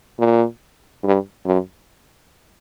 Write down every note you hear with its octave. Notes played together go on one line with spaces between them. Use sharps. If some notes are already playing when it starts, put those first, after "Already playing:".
A#2
G2
F#2